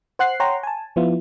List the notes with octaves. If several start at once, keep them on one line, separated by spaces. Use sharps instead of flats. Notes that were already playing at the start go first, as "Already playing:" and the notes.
C5 F#5 F#6 C7
C#5 F#5 G5 A#5 C6
G#5 A5
F3 B3 E4 F4